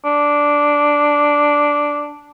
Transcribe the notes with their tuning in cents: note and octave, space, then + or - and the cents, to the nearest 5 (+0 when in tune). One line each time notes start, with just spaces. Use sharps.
D4 -5